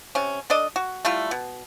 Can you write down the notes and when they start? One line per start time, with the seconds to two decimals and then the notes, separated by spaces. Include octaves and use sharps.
0.15 C3 C#4
0.50 D4 A4 D5 D#5
0.76 F#4
1.05 G3 A3 E4 F4
1.31 B2